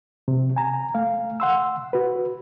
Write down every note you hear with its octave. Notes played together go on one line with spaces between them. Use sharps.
C3
G#5 A#5
A3 F5
F#5 C6 E6
F#4 B4